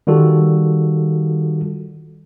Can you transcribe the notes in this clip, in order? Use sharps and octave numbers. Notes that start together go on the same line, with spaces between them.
D#3 G3 F4 F#4 A4